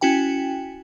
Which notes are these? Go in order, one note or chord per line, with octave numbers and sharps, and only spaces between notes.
C#4 E4 F#4 G5 G#5